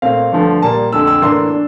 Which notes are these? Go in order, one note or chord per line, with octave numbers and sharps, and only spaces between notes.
A#2 A3 C4 F5
G2 D3 F3 A3
A#2 G3 A#3 A5
F2 D3 A3 E6
E6
A2 E3 A#3 D4 C6
D4